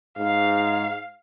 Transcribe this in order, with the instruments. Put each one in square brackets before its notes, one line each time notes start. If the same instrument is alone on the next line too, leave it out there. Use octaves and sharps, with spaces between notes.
[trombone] G#2 [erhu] F5